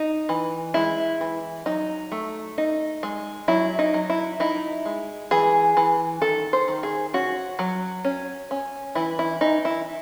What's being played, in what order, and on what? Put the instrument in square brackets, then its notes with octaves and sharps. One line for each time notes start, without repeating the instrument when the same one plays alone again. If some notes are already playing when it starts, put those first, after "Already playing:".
Already playing: [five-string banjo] D#4
E3
G#3 E4
E3
F#3 D#4
A3
D#4
G#3
F#3 E4
D#4
F#3
E4
D#4 E4
G#3
E3 G#4
E3
D#3 A4
C5
D#3
G#4
C#4 F#4
F#3
C#4
C#4
E3 E4
E4
E3 D#4
E4